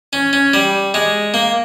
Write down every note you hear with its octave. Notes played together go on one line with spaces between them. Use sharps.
C#4
C#4
G3
G#3
A#3